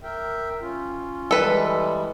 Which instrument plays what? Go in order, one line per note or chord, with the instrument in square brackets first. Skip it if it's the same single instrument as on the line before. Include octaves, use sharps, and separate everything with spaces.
[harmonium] A#4 E5 G5
C#4 F4
[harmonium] E3 G3 G#3 [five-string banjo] A4 B4